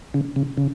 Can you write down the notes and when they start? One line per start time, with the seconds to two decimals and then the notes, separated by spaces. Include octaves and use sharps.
0.14 C#3
0.36 C#3
0.57 C#3